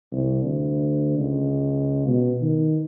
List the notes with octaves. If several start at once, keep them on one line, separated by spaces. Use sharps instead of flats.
C2
D2
C#2
B2
D#3